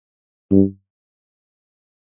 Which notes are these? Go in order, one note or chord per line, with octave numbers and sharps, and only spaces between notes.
G2